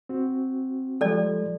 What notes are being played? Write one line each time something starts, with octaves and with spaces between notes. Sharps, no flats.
C4 F#4
F3 G3 G#3 A4 D5